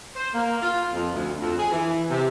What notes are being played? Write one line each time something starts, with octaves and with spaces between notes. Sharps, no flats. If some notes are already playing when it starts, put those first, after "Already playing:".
C5
A#3
F4
F2
D2
F2
G#4
E3
C3